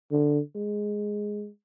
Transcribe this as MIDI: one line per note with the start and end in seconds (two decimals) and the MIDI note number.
0.11 0.39 50
0.55 1.48 56